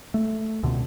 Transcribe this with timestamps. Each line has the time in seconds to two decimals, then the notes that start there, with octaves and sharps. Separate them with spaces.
0.14 A3
0.63 C#2 B2 D3